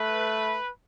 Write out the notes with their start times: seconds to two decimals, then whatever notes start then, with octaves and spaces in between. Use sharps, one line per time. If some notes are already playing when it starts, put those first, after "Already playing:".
Already playing: A3 B4